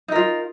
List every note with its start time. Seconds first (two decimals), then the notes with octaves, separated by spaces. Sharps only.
0.08 D#4
0.12 A#4
0.16 F4